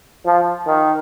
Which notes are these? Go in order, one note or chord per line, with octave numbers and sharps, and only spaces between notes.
F3
D#3